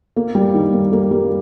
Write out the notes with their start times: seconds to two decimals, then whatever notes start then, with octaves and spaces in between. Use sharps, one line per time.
0.16 A#3
0.35 G3
0.54 D#3
0.73 A#3
0.93 A#3
1.11 G3